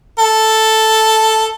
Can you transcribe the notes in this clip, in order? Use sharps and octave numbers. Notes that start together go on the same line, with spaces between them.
A4